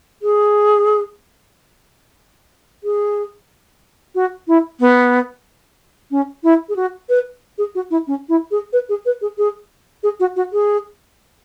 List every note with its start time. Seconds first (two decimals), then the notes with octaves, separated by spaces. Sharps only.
0.22 G#4
2.84 G#4
4.15 F#4
4.48 E4
4.80 B3
6.11 C#4
6.43 E4
6.69 G#4
6.76 F#4
7.09 B4
7.58 G#4
7.75 F#4
7.91 E4
8.07 C#4
8.29 E4
8.51 G#4
8.73 B4
8.89 G#4
9.06 B4
9.21 G#4
9.38 G#4
10.03 G#4
10.20 F#4
10.36 F#4
10.53 G#4